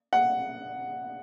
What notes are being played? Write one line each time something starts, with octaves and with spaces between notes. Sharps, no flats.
F#5